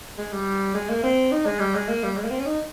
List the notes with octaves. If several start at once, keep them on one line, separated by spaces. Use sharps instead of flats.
G#3
G3
G#3
A#3
C4
D#4
G#3
G3
G#3
A#3
G3
G#3
A#3
C4
C#4
D#4